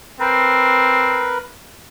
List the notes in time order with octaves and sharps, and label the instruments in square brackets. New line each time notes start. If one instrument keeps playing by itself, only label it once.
[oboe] C4 [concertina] A#4 B4